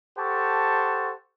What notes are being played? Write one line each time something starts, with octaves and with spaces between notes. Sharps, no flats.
G4 A4 C5 F#5 A5 C#6